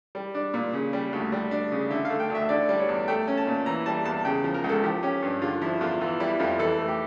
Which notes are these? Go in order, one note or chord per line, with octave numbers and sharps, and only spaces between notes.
G3
D4
A#2
C#3
G3
D2
G3
D4
C#3
D3 E5
F5
A3
G5
D2 E5
D3 D5
G3
C#5
E2
A3 G5
C#4
A5
A#2
E3 A#5
G3 A5
E2 A5
C#3 G5
F3
A#4
C#2
A4
F3 G4
C#4 G4
G2
D3 F4
F3 E4
E2 F4
E3 F4
G3 E4
F2 F4
E3 A4
A3
G4